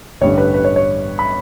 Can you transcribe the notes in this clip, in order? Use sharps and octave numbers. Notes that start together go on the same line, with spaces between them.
A1 G2 D3 C#5
B4
B4
C#5
C#5
B5